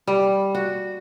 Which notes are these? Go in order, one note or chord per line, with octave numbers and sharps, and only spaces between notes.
G3
F#4